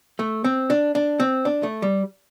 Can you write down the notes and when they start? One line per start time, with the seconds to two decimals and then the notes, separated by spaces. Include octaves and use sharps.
0.19 A3
0.44 C4
0.70 D4
0.95 D4
1.20 C4
1.45 D4
1.63 A3
1.82 G3